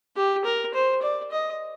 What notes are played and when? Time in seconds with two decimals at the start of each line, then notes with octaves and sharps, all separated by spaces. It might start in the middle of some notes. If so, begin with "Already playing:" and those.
0.16 G4
0.45 A#4
0.74 C5
1.02 D5
1.32 D#5